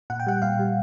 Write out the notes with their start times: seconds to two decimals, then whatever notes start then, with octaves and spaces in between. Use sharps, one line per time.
0.10 A#2 F#5
0.20 G5
0.26 G3 F#5
0.42 A#2 F5
0.59 G3